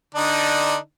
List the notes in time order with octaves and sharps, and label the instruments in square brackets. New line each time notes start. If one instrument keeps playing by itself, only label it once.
[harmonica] D3 D4 D#4